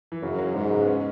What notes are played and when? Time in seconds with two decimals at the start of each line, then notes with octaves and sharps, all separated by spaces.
0.12 E3
0.22 F#2 C#3
0.38 F#3
0.55 G#2 G#3
0.71 C#3
0.80 B3
0.88 C#4